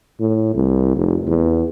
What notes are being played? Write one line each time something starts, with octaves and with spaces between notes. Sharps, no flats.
A2
C2
F1
E2